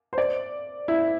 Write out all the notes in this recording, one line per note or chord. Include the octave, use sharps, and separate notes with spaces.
C5
D5
E4